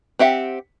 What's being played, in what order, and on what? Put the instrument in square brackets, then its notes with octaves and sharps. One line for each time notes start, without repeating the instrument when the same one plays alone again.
[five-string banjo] C4 G4 E5 F#5